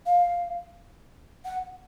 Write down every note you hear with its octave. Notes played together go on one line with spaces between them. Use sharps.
F5
F#5